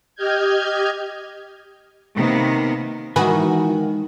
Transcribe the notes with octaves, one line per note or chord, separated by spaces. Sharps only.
G4 D#5 F6 G6 G#6
C3 D#3 A#3 B3
D#3 E3 G#3 D#4 F#4 B4 G#5